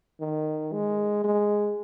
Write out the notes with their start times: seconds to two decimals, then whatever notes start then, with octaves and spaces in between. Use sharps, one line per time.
0.20 D#3
0.73 G#3
1.24 G#3